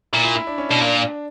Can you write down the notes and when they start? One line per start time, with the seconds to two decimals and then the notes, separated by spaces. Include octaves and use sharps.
0.13 A#2 E4
0.24 E4
0.35 E4
0.47 D4
0.58 C#4
0.69 B2 D4
0.80 A#2